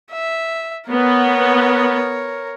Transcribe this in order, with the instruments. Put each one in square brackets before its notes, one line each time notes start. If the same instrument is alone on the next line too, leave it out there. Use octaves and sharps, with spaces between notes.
[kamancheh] E5
[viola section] B3 [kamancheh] A#4 C#5